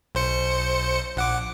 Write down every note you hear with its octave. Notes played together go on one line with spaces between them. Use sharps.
B1 C5 C#7
A#1 F#5 D6